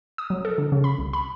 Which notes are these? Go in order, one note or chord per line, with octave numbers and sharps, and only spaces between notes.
D#6
F#3
A4
D3
C#3
B5
C2
B5